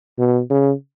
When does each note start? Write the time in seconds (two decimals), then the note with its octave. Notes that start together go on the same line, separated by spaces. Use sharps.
0.19 B2
0.50 C#3